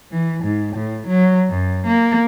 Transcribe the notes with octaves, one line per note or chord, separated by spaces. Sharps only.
E3
G#2
A2
F#3
F#2
A#3